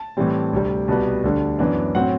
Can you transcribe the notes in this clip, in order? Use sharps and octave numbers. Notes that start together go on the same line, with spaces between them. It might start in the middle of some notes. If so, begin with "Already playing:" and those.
Already playing: A5
A2 E3 G3 C4
D2 C3 G3
C2 B2 G3 B3 A5
D2 D3 G3
F#2 E3 B3 D4
A2 F#3 C4 F#5